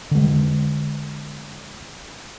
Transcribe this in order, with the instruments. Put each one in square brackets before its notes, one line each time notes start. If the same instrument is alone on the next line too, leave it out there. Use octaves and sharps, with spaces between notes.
[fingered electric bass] D3 G#3